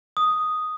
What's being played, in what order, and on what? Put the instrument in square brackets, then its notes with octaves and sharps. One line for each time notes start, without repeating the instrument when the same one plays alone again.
[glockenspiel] D#6